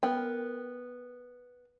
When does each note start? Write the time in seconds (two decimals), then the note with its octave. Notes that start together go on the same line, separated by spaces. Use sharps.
0.03 B3 A#4 G5